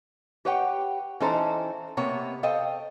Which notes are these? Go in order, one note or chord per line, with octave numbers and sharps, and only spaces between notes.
G4 B4 C#5 F#5 G5
E3 C#4 D#4 A4 C5 A#5
C3 A#3 B3 C#5
A4 C5 D#5 F5 G5